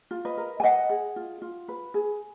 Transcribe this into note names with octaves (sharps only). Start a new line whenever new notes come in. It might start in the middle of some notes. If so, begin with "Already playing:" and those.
F4
B4 D#5
A#4
G#5
B4 D#5 F#5
G#4
F4
F4
B4
G#4